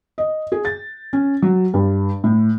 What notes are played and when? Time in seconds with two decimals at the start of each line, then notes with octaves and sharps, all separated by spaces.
0.18 D#5
0.52 G#4
0.65 A6
1.13 C#4
1.42 F#3
1.74 G2
2.24 A2